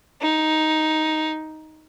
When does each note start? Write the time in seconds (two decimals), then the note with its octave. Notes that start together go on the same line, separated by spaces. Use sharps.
0.22 D#4